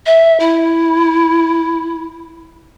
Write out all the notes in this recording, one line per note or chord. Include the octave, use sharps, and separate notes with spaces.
E5
E4